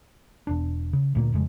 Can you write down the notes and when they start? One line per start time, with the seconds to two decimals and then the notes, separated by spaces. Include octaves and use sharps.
0.47 E1 D4
0.93 C#3
1.15 D2 A#2 A#3
1.32 F1 F2 C#3 G#3